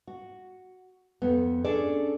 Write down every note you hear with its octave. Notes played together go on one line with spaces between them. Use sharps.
F#4
F2 B3
C#4 D4 G#4 A4 D5